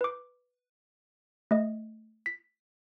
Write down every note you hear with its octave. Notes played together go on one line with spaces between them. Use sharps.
B4 D6
A3 D#5
B6